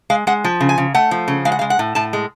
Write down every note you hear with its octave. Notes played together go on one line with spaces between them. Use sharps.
G#3 F5
G#3 F#5
F3
C#3
G#5
C#3
A3 F#5
F3
C#3
G#3 F5
F#5
G#3 F5
F#5
A2
A2 A5
G#3